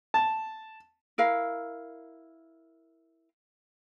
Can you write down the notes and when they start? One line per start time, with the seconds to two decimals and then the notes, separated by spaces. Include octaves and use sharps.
0.14 A5
1.18 E4 A#4 F5